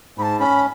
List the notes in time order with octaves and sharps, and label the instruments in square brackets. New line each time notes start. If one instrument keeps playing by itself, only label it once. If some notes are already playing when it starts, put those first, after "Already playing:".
[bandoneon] G#2 [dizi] B5
[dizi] A5
[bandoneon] C#4 [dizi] B5